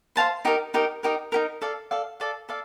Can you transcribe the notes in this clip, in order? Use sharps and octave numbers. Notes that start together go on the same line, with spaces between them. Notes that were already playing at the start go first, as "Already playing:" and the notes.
C5 F5 A5 C6
D#4 G4 A#4
D#4 G4 A#4
D#4 G4 A#4
D#4 G4 A#4
A4 D5 F5
A4 D5 F5
A4 D5 F5
A4 D5 F5